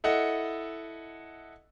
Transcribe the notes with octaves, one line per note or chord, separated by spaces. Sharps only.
E4 A4 D#5 F#5